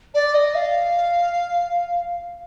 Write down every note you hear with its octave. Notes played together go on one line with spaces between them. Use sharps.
D5
D#5
F5